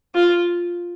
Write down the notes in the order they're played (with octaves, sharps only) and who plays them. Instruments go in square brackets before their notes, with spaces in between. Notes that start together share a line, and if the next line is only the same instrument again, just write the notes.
[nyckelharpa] F4